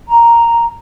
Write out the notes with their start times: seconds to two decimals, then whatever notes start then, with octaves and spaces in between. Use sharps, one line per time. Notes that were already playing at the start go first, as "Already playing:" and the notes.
0.07 A#5